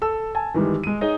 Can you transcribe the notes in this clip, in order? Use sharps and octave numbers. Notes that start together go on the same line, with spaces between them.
A4 E6
G#5 A5
D#3 E3 G3 G#3
G#3 D#7
D#4 G#4 C#5 D#5